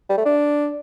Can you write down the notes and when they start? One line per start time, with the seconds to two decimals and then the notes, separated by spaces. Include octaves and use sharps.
0.09 G3
0.17 A3
0.25 D4